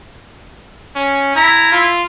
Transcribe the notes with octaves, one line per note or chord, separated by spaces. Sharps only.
C#4
E4 A#5
F4